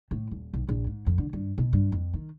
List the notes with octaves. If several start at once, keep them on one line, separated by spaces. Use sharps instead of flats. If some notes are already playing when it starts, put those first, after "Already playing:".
A2
D#1
B1
A#1
G#2
F2
D3
G2
B2
G2
F2
D#3